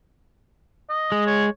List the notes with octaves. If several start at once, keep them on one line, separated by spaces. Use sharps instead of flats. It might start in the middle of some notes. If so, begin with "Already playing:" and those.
D#5
G#3
C#5